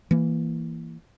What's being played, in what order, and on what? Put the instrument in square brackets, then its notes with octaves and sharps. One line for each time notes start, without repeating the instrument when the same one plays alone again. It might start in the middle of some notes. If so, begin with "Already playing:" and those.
[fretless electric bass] E3 A#3